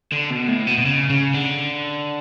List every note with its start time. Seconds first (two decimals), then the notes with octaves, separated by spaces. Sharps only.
0.12 D3
0.30 B2
0.48 A2
0.67 B2
0.77 B2
0.85 C#3
1.10 C#3
1.34 D3